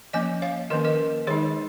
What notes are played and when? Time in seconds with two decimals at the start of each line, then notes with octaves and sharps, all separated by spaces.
0.13 F3 A#3 C#4 D#5 G#5
0.42 C#5 F5
0.70 D#3 A#3 C#4 A#4 D#5
0.84 A#4 D#5
1.27 D#3 G#3 D#4 G#4 C#5